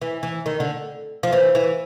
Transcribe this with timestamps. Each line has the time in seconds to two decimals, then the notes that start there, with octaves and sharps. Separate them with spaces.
0.02 E3
0.23 E3
0.46 D#3
0.60 D3
1.23 F3
1.33 E3
1.55 E3